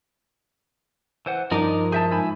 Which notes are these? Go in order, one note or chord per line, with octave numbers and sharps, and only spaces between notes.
E3 C5 F#5
G2 F3 D4 D#4 A#4 D#5 D6
G#4 E5 A5 G6
G#2 E5 G#5 B5